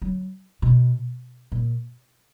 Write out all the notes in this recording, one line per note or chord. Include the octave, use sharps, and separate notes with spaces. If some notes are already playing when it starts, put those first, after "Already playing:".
F#3
B2
A#2